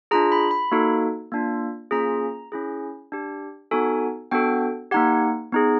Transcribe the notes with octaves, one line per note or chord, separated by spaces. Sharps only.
D4 F4 G#4 A#5
B5
B5
A#3 D#4 F#4 A4
A#3 D4 F4
A#3 C#4 F4 G#4 A#5
C#4 E4 G#4
D4 G4
B3 D#4 F#4 A4 G#5
B3 D4 F#4 A4 G5
A#3 D#4 G4 F#5
B3 D#4 G#4